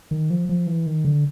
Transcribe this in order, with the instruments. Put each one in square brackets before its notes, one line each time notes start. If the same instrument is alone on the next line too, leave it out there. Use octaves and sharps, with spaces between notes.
[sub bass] D#3
F3
F3
E3
D#3
D3